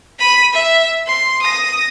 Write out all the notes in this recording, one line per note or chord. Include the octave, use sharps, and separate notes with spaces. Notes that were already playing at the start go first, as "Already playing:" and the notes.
B5 D#7
E5
C6
D#6 A#6